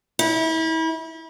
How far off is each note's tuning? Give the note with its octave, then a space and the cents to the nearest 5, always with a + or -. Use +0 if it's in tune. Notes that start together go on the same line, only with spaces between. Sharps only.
E4 -35